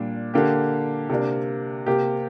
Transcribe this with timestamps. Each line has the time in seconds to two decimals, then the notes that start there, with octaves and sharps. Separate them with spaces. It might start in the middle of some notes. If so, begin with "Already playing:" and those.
Already playing: A#2 G3 D4
0.34 D3 A#3 G4
1.09 C3 A#3 D4
1.86 C3 A#3 G4